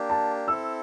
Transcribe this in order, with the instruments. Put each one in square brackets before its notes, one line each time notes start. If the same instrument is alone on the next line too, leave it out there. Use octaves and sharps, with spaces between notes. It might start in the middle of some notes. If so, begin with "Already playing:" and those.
Already playing: [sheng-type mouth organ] A#3 D4 G4
[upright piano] A5
[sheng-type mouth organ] C4 E4 A4 [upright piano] E6